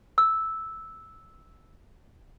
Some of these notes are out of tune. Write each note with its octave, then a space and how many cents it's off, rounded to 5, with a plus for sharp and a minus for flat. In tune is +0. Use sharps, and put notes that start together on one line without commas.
E6 -5